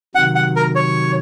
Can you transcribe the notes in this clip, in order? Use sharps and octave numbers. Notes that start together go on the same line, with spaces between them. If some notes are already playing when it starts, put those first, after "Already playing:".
C3 D#3 F#3 F#5
F#5
A#4
C#5